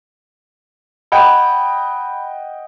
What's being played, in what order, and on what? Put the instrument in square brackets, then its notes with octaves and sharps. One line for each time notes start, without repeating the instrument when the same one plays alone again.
[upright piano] D#5 F#5 G5 [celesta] B5 G#6